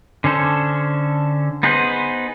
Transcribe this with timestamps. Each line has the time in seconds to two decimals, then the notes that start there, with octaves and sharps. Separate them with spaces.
0.24 D3 C#4 A4 C5
1.63 B3 D#4 G#4 B4 C5